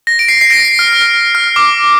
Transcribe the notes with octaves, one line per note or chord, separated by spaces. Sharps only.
A#6
D7
C7
C7
A#6 D7
C7
F6
F6
F6
D6